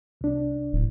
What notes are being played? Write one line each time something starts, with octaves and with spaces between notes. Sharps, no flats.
C2 D4
D1